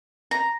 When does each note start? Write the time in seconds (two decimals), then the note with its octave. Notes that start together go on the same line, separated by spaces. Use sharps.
0.31 A#5